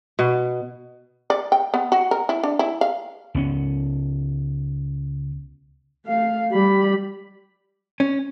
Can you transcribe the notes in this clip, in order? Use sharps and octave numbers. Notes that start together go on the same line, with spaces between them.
B2
D5
G5
B3
F#4
A#4
E4
D4
E4
F5
C#2 B3 C#4
A3 F5
G3 B5
C#4